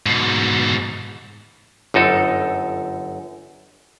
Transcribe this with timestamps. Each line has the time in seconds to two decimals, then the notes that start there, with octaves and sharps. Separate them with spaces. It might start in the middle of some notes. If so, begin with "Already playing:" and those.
0.06 G#2 B2
1.94 G1 F#2 D#4 A4